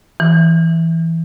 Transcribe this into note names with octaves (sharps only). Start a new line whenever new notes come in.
E3